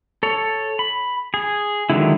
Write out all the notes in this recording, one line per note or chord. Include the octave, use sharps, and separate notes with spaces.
A4 C#5
B5
G#4
D3 D#3 F#3 G#3 E4